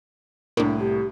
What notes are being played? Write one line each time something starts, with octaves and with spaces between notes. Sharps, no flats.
C2 A2 A#3 D4
G4